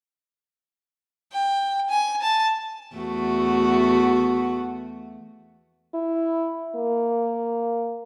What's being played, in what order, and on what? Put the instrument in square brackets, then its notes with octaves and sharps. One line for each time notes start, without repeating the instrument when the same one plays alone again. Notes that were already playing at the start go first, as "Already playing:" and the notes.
[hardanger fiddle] G5
G#5
A5
[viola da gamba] E2 A3 F#4
[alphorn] E4
A#3